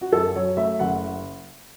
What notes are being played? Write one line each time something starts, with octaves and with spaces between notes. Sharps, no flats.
F#4
F#2 A4
F#3 C#5
A3 E5
F#1 F#5